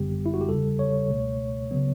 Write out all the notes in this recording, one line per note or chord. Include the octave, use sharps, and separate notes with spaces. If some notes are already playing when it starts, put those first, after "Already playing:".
Already playing: G1 F#2 D3 G3 B3 G4
E4
F#4
G4
E2 C#3 G3 A4
C#5
C#2 B2 A3
C#3 F#3 B3